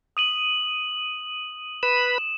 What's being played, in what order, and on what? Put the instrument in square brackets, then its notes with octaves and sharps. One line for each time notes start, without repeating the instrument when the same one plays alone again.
[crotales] D#6 D#7 F#7
[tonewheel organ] B4 B5 [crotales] E7